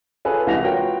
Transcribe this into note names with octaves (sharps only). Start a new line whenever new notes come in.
C#4 F4 G#4 A4 B4 G#5
C2 E3 G#3 G4 A#6 F7
F4 F#4 A#4 B4 C#5 G5